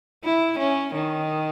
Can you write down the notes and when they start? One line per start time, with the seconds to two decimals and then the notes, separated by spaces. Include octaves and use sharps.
0.24 E4
0.59 C#4
0.94 D#3